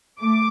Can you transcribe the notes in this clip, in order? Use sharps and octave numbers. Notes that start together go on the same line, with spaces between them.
A3 D6